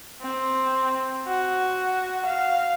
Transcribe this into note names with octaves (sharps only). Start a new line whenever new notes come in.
C4
F#4
F5